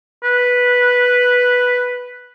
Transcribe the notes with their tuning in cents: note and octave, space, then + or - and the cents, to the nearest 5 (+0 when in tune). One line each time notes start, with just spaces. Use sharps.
B4 -5